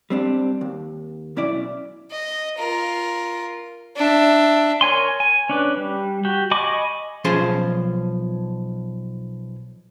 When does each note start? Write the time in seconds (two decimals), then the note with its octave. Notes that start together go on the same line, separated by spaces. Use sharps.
0.10 G3 C4 D4
0.61 D#2
1.36 B1 C#4 E4 D5
2.11 D#5
2.57 F4 A#4
3.96 D4 E5
4.81 A#4 C#5 G#5 C6
5.20 G#5
5.49 C#4 D4 B4
5.77 G3
6.25 F#4 G4
6.51 D#5 G#5 B5 C#6 D6
7.24 B1 F3 C#4 G#4 C5 C6